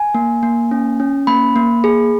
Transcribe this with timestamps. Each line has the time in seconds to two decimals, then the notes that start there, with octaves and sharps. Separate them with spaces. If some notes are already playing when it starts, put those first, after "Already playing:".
Already playing: G#5
0.15 A#3
0.43 A#3
0.71 C#4
1.00 C#4
1.27 A#3 B5
1.56 A#3
1.84 G#4